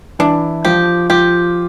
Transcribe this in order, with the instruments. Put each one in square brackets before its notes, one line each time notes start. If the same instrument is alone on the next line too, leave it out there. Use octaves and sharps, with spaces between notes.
[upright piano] E3 E4 [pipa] D4
[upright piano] F3 F4 [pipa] G4
[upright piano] F3 F4 [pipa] G4